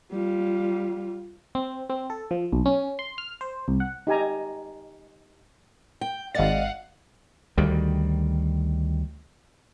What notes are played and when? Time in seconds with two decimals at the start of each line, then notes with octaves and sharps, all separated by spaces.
0.12 G3 F4
1.55 C4
1.90 C4
2.10 A4
2.31 F3
2.52 B1
2.66 C#4
2.99 C6
3.18 F6
3.41 C5
3.68 C2
3.80 F#5
4.07 D#4 G4 G#5 A#5
6.01 G5
6.35 G#1 D5 D#5 F5 F#5 A6
7.58 D2 D#3 G3